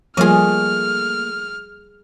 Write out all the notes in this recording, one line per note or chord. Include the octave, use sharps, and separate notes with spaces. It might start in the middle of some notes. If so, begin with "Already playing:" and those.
F3 G3 A3 A#3 F4 G#4 D#5 F6